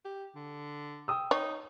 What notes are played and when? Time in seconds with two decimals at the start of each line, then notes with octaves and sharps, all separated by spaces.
0.05 G4
0.35 D3
1.08 G5 D#6 E6
1.31 D#4 C#5